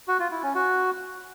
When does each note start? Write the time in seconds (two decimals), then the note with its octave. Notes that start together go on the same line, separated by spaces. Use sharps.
0.08 F#4
0.20 F4
0.31 E4
0.43 C#4
0.55 F#4